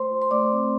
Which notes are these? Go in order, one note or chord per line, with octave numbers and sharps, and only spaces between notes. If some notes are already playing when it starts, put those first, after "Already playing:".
Already playing: A3 C5 C6
F4
C6
A3 D5 D6
C4